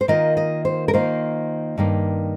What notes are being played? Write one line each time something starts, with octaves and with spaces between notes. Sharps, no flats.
C5
D#3 A#3 F4 D#5
D#5
C5
A#4
D#3 A#3 F4 C5
G2 D#3 A#3